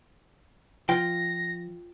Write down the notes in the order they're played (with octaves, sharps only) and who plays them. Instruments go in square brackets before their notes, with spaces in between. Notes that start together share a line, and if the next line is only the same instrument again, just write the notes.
[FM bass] F3 [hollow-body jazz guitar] F4 G5 [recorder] A#6